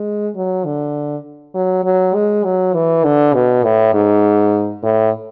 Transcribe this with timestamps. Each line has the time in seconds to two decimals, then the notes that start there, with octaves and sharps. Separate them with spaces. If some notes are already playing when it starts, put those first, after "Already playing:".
Already playing: G#3
0.36 F#3
0.65 D3
1.55 F#3
1.84 F#3
2.15 G#3
2.44 F#3
2.74 E3
3.04 D3
3.34 B2
3.64 A2
3.94 G#2
4.83 A2